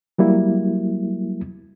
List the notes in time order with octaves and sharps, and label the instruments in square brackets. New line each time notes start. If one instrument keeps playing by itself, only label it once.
[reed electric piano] F#3 G3 A#3 E4